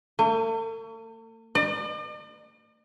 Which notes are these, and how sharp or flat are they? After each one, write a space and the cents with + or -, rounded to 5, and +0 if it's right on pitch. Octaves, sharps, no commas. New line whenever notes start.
A3 +45
D5 +45